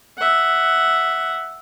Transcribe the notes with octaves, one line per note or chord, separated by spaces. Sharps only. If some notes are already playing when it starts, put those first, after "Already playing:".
E5 F#5